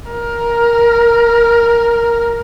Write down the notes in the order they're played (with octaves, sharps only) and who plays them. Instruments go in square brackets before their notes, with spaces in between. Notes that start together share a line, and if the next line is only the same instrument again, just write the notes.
[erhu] A#4